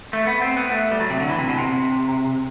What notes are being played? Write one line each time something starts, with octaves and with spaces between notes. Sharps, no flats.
A3
B3
C4
B3
A3
G3
F#3
C3
D3
E3
C3
B2
C3